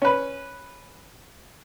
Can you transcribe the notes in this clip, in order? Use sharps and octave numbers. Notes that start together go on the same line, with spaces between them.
C#4 B4